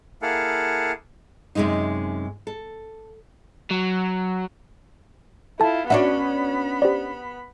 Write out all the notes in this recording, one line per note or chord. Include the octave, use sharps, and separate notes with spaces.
A#3 E4 G#4 A4 F5 F#5
F#2 C3 G#3 C#4 D#4
A4
F#3
E4 F4 A4 A5
B3 C#4 D4 F#4 E5 F#5 B5
G4 C5 D5